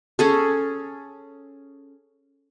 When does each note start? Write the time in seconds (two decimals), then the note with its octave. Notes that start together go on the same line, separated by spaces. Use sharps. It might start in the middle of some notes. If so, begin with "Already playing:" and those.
0.19 C#4 G#4 A4